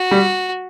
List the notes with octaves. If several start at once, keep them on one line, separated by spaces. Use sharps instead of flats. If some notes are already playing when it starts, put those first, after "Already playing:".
Already playing: F#4
G3